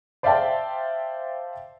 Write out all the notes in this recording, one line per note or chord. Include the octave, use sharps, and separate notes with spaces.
C5 D5 E5 F5 G5 A5